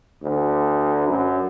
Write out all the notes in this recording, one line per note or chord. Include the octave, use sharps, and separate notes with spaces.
D2
F#2